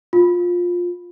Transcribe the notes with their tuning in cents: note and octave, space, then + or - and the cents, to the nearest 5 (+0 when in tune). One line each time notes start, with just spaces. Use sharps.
F4 +15